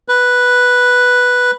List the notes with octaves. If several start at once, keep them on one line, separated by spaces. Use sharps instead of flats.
B4